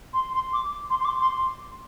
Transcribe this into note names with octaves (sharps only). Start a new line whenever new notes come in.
C6
C6
D6
C6
C6
D6
C6